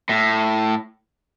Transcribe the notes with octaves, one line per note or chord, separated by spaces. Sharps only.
A2